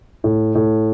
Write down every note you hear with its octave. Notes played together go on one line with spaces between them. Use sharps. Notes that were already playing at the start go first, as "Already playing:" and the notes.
A2
A2